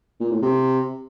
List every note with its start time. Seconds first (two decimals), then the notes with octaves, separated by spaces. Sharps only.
0.21 A#2
0.31 A2
0.42 C3